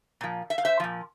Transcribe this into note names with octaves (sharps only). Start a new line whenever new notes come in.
A#2 F3
E5
F5
C5 E5
A#2 F3